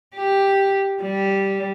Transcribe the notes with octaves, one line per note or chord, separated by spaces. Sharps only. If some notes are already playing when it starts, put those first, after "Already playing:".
G4
G3